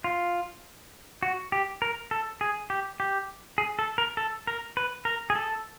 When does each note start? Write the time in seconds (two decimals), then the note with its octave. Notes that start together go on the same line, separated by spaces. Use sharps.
0.04 F4
1.23 F#4
1.52 G4
1.82 A#4
2.11 A4
2.41 G#4
2.70 G4
3.00 G4
3.58 G#4
3.79 A4
3.98 A#4
4.17 A4
4.47 A#4
4.77 B4
5.05 A#4
5.30 G#4
5.36 A4